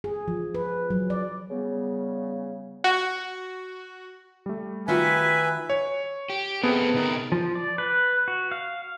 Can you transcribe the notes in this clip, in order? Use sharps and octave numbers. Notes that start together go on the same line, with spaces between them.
G#4
F3
B4
F#3
D5
C#3 G3 B3
F#4
G3 A3
D#3 F4 F#4 B4 E5 G#5
C#5
G4
A3 B3 C4 G#4 A4
C3 D#4 A#4
F3
D5
B4
F#4
F5